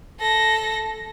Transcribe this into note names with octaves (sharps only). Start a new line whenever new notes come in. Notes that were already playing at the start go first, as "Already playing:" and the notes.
A4 A#6